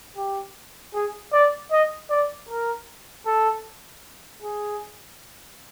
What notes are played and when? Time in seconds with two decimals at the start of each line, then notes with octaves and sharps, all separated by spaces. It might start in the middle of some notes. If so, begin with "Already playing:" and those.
0.16 G4
0.94 G#4
1.33 D5
1.71 D#5
2.10 D5
2.49 A#4
3.26 A4
4.42 G#4